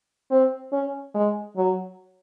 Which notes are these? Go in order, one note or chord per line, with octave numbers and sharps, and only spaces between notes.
C4
C#4
G#3
F#3